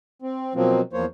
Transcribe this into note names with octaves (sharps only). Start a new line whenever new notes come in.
C4
B2 F3 F#3 A#3 C4
E2 F3 A#3 C5 C#5